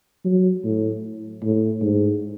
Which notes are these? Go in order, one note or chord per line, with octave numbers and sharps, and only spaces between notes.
F#3
A2
A2
G#2